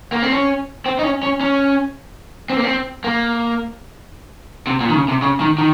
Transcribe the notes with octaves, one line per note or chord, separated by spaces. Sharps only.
A#3
C4
C#4
C4
D#4
C#4
C#4
C#4
C4
A#3
C4
A#3
C3
A#2
D#3
C#3
C3
C#3
D#3
D#3